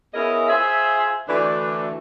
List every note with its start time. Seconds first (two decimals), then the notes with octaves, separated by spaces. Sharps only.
0.13 B3 C#4 E4 G#4 A#4 D#5
0.48 F4 G#4 C5 E5
1.27 D2 E3 A3 D4